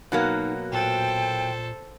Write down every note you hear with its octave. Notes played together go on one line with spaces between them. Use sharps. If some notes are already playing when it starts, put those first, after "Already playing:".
B2 F#3 A#3 D#4
A#2 A4 C5 G5